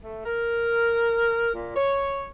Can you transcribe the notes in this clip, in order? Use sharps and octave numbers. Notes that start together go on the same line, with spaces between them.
A3
A#4
A#2
C#5